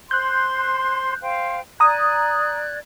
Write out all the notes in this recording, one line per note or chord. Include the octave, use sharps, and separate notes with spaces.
C5 C6 F#6 G6
C5 F5 G5
D5 A#5 D#6 F#6 G#6